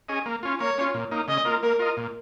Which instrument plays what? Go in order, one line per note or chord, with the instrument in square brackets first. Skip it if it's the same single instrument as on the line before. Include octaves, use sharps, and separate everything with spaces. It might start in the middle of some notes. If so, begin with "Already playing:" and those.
[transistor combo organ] C#4 G#4 D#5
A#3
C#4 F4
[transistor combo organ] A#3 [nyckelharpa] C#5
[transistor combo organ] C#4 F4
A#2
A#3 D#4
[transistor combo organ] C#3 [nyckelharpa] D#5
[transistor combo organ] A#3 F4 A#4
[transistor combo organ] A#3 [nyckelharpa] A#4
[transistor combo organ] F4 A#4 D#5
A#2